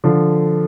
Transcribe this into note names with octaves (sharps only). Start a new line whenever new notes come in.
D3 F3